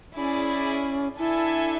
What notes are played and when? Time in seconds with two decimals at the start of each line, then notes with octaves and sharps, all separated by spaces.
0.16 C#4 D4 E4 G#4 D5
1.18 D4 E4 A4 E5 G#5